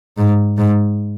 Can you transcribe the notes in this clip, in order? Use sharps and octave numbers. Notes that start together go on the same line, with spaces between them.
G#2
G#2